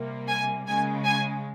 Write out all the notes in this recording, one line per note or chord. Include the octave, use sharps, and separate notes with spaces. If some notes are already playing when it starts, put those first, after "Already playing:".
Already playing: C3 G3 A#3
G#5
C#3 G#3 G#5
G#5